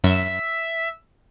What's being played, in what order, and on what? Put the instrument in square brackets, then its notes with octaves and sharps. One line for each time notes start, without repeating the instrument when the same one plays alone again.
[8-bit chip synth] F#2 [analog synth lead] E5